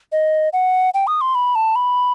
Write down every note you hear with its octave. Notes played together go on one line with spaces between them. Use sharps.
D#5
F#5
G5
D#6
C6
B5
A5
B5